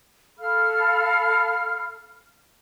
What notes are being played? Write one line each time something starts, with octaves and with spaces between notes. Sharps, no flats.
A4 F5 B5 F6